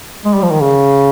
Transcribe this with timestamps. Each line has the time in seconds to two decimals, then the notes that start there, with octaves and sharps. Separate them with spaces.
0.25 G#3
0.34 G3
0.42 F3
0.51 D#3
0.61 C#3